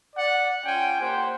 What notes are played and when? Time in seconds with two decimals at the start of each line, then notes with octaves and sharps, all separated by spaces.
0.16 D5 F#5
0.65 C#4 F4 G5 G#5
1.00 A#3 G4 C5 F#5